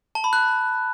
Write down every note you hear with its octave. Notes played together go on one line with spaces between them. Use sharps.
A5
B5
F#6